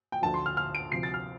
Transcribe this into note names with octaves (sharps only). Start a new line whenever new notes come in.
G5
D2 D3 F3 A5
C6
F6
F6
D7
D2 C3 F3 C7
A6
F6